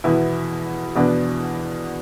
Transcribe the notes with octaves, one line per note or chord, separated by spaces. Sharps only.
E2 B2 B3 E4
E2 B2 B3 D4